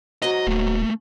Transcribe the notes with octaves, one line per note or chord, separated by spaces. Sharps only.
G#2 F#3 D#5
D#1 A3 A#3